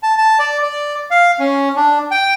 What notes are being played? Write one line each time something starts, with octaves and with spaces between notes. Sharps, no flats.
A5
A5
D5
D5
F5
C#4
D4
G5